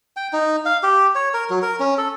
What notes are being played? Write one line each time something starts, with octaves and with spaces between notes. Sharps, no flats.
G5
D#4
F5
G4
C#5
A#4
F#3
A#4
C#4
A4